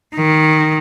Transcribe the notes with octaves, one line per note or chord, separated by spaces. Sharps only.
D#3